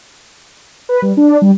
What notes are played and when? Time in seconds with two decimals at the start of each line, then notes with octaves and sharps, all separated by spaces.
0.89 B4
1.02 G3
1.17 D4
1.42 G3